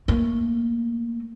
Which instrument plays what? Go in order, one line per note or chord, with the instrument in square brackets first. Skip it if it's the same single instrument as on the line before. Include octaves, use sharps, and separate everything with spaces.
[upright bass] A3 A#3